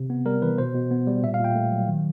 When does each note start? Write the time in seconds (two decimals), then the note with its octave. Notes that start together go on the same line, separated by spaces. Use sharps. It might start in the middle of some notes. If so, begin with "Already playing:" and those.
Already playing: C3
0.10 B3
0.25 G3 A#4
0.42 E3 B4
0.58 B2 C5
0.75 B2
0.91 B3
1.07 G3
1.23 A#2 E5
1.34 F5
1.39 A#2
1.44 G5
1.55 A3
1.72 F#3
1.88 D#3